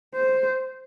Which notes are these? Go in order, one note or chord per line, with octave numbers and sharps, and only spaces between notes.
C5